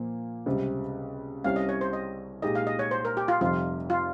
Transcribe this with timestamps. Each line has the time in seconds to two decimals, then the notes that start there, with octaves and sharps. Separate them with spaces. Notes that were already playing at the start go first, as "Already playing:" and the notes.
Already playing: A#2 F3 A#3
0.46 C#2 C3 G3 C4
1.44 C2 C3 G3 C#4 F5
1.56 D#5
1.69 C#5
1.81 C5
1.93 D#5
2.42 A#2 G#3 D#4 G4 D#5
2.55 F5
2.67 D#5
2.79 C#5
2.91 C5
3.05 A#4
3.17 G4
3.28 F4
3.41 F1 F2 C3 G3 C4 F4
3.90 F4